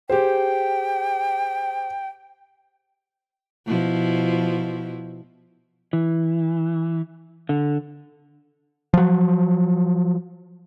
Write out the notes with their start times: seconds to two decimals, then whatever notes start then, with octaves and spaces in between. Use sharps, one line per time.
0.10 G4 G#4 C5 G5
3.66 B2 F3 E4
5.93 E3
7.49 D3
8.94 F3 F#3